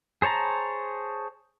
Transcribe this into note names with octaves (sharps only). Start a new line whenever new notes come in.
G#4 C5 C#5 A5 A#5